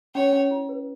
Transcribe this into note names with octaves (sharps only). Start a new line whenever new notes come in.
C#4 C#5
C#4
E4
B4